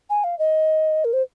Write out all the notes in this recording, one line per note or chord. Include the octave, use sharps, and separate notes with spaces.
G#5
F5
D#5
A#4
C5